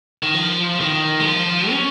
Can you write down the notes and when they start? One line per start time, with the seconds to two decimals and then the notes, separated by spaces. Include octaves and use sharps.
0.23 D#3
0.34 F3
0.80 D#3
1.20 G#3
1.25 F3
1.71 C#4